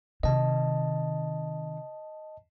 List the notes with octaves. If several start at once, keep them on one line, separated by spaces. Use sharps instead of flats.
C3 D#3 D#5 A5